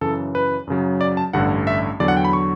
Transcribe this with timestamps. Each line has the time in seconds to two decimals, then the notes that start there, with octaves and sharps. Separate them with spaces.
0.01 F#2 C#3 E3 A4
0.35 B4
0.67 F#2 C#3 F#3
1.01 D5
1.17 A5
1.33 A1 G2 D3 F#5
1.67 E5
2.00 E2 D3 F#3 D5
2.08 F#5
2.17 G5
2.25 B5
2.33 C#6